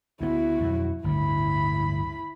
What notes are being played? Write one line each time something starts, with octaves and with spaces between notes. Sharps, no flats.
D2 A3 B3 E4 F#4
F2 B2 F#3
G1 D2 A2 E4 B5